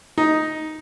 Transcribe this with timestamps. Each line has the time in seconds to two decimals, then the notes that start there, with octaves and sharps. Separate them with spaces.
0.18 D#4